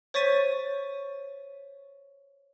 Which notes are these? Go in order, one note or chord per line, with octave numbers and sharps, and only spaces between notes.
C5 C#5 C#6 A6 B6 D#7